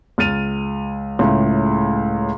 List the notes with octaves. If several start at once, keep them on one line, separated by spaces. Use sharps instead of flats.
C#2 F6 A6 D#7 F7
C#2 A2 C#3